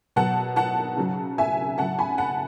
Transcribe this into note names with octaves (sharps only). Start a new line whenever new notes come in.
B2 F#3 F#5 A5
F#5 A5
C#3 F#3
E5 G#5
C#3 F#3 F#5 A5
G#5 B5
F#5 A5